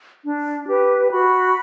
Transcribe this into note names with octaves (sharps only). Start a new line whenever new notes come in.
D4
G4 B4
F#4 B5